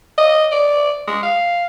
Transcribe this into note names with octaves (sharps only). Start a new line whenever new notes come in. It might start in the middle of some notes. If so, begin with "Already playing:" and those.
D#5
D5
G#3
F5